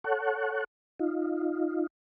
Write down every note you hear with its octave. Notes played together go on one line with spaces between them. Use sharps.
A4 C#5 F#5
D#4 F4